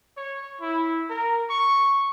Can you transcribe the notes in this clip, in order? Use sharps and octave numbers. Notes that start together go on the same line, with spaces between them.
C#5
E4
A#4
C#6